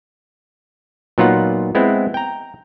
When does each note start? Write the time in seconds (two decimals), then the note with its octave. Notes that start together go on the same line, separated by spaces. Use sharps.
1.18 A#2 F#3 B3 D#4 F4 F#5
1.75 G#3 B3 C4 E4
2.14 G5 A#5